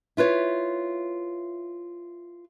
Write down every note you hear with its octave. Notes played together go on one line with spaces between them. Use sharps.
E4 F4 B4 C#5